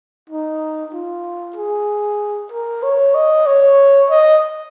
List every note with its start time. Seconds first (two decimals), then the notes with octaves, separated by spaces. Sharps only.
0.30 D#4
0.93 F4
1.56 G#4
2.51 A#4
2.83 C#5
3.15 D#5
3.47 C#5
4.10 D#5